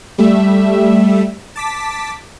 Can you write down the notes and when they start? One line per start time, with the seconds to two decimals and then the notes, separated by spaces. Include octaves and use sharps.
0.18 G3 A3 E5
1.56 A5 D6 B6